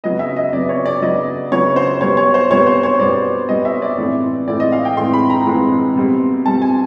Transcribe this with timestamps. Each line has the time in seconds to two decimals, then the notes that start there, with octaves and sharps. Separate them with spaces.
0.04 C#3 F#3 B3 D#5
0.19 E5
0.36 D#5
0.53 C#3 F#3 B3 D5
0.69 C#5
0.86 D5
1.02 C#3 F#3 B3 D#5
1.52 C#3 F#3 B3 C#5
1.76 C5
2.01 B2 G3 B3 C#5
2.17 C#5
2.34 C5
2.50 B2 G3 B3 C#5
2.67 C5
2.83 C#5
3.00 B2 G3 B3 D5
3.49 B2 G3 B3 D#5
3.65 E5
3.82 D5
3.98 A2 E3 G#3 C4
4.48 A2 E3 G#3 C4 D5
4.60 D#5
4.72 F5
4.85 G5
4.97 A2 E3 G#3 C4 C6
5.13 B5
5.30 A#5
5.46 A2 E3 G#3 C4
5.96 B2 G3 C4
6.45 B2 G3 C4 A5
6.62 G#5